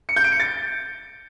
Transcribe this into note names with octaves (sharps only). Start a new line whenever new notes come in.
C#7
G6
D7
C#7
A6